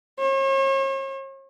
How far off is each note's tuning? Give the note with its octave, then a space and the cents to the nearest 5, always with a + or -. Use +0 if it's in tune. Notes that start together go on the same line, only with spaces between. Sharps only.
C#5 -40